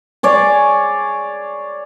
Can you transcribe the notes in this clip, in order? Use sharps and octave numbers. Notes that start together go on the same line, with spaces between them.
G#4 C#5 D5